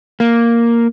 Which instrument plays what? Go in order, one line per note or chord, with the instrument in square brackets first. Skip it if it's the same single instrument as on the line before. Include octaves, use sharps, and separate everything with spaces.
[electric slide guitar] A#3